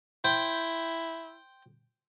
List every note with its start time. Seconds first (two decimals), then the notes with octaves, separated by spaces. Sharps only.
0.24 E4 C5 G5